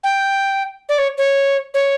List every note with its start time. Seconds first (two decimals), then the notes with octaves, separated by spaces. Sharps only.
0.04 G5
0.89 D5
0.98 C#5
1.18 C#5
1.74 C#5